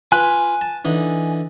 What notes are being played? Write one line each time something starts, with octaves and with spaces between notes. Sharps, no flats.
F4 B4 G#5 F#6
A5
D3 E3 D#4